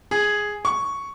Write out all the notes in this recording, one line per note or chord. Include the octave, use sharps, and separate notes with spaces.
G#4
C#6